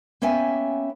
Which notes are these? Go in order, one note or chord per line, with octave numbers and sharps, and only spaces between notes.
A#3 B3 C#4 E5 G5 G#5